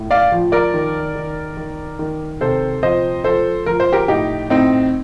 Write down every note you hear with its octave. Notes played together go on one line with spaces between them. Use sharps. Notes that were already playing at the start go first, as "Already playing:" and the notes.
Already playing: A2
D5 F5
F3
A#4 D5
D#3
D#3
D#3
D#3
C3 A4 C5
F3 C5 D#5
F3 A4 C5
F3 A#4
C5
G4 A#4
A2 D#4 G4
A2 C4 D#4